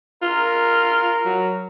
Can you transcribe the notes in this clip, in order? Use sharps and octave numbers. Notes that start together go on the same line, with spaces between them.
F4 A#4
F#3